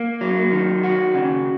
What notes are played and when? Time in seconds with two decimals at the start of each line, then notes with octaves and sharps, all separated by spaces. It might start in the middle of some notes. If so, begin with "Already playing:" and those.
Already playing: A#3
0.21 F#3
0.52 D#3
0.83 F#4
1.15 C#3